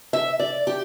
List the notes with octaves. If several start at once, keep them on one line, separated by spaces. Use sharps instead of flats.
E5
D5
G4